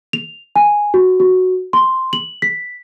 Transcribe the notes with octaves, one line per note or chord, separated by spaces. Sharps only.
F7
G#5
F#4
F#4
C6
F#7
B6